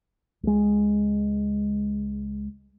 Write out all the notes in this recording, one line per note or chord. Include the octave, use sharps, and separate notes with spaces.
C#2 G#3